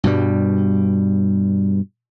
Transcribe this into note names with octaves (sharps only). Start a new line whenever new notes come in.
G2 B2 G3